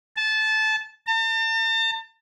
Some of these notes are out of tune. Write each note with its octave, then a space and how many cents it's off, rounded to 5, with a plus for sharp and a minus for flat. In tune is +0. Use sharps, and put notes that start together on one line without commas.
A5 -20
A5 +40